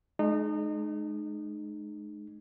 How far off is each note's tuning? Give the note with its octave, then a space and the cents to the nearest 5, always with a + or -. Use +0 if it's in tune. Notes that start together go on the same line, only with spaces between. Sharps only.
G#3 +35 D#4 -30